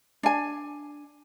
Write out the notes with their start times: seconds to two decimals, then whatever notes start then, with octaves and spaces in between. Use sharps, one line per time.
0.23 D4 G#5